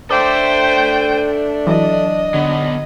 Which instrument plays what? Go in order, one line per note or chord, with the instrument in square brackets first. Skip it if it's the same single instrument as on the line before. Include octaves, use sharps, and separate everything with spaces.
[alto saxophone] D4 [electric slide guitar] A4 E5 [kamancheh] C5 G5 [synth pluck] D6
[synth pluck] E3 F#3 [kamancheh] D#5
[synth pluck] D3 [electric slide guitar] F#3 B3